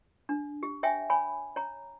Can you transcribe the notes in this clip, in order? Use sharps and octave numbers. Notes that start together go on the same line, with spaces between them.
D4
G4
C#5 E5 G5 G#5
C#5 G#5 B5
C#5 A#5